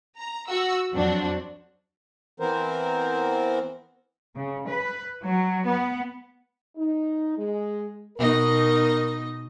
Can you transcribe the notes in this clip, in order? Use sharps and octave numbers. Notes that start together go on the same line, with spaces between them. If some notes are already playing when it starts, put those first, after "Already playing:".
A#5
F#4 E6
F2 F#3 C4 D4 F#4
E3 B3 C4 A#4 C5
C#3
B4
F#3
B3
D#4
G#3
B2 D#4 A#4 D#5